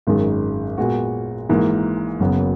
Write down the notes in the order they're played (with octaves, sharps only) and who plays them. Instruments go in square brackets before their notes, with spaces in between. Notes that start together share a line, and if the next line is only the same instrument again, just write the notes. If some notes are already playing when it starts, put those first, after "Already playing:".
[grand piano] G#1 F#2 D#3 G#3 C#4
A#2 G#3 B3 F#4
G#1 G#2 E3 A#3
F#1 F#2 C#3 F#3 B3